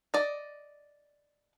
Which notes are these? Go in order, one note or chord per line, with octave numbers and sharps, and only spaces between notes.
D5 D#5